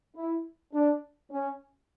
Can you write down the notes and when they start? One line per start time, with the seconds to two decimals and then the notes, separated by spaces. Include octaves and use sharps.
0.16 E4
0.74 D4
1.31 C#4